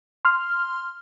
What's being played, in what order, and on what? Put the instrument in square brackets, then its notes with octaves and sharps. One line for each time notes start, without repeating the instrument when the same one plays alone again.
[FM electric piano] C6 F6